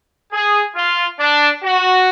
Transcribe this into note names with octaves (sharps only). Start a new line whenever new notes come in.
G#4
F4
D4
F#4